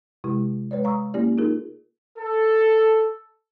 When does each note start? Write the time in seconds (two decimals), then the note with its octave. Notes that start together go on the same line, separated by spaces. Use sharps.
0.24 C3 G#3 E4 G4
0.71 G#3 B4 C#5 D5
0.84 F5 A#5 C#6 D#6 E6
1.14 A#3 C#4 E4 G4 D5
1.38 D#4 F4 G#4 A#4
2.18 A4